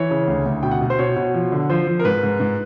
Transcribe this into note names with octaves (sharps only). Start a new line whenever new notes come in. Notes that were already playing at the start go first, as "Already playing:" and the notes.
Already playing: E3 C#5
C#3
D2
D2
B2 G5
F#5
B2
C5
B2 C#5
B2
F3
D3
F3 C5
F3
A#4
G#2 B4
G#2
G#2